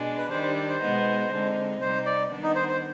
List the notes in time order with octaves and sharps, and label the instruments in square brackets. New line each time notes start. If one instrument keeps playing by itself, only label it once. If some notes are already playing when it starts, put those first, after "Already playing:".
Already playing: [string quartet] B2 G#3 D4
[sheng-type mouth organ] B4
[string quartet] D#3 G3 D4 [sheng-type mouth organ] C5
[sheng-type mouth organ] C5
C5
[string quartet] B2 G#3 B3 D#4
D3 G#3 C4 D#4
[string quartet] C3 G3 C4 D#4 [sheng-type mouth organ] C5
[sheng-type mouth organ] D5
[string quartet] D#3 G3 B3 D4
[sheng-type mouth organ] D#4
C5
C5